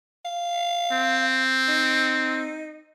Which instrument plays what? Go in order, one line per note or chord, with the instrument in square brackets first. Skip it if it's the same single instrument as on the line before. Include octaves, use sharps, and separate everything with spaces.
[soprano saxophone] F5
[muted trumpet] C4
[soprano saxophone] D#4